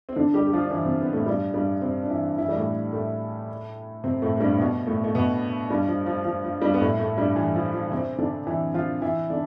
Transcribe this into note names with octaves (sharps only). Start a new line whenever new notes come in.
C4
D3 D4
G3 G4
G4
F3 F4
D4
E3 E4
C3 C4
B3
A2 A3
G2 G3
G2 G3
C3 C4
D4
E3 E4
E3 E4
G3
A2 A3
A2 A3
C3 C4
A2 A3
A3
G2 G3
B2 B3
A2 A3
A3
B2 B3
G2 G3
F3
F3
F3
F3
G2 G3
B3
A2 A3
A2 A3
G2 G3
E3
F3
F3
C3 C4
D3 D4
E3 E4
F3 F4
E3 E4
D3 D4